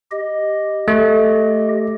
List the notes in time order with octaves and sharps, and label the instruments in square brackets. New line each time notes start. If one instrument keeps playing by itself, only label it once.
[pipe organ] G4 D#5
[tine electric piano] A3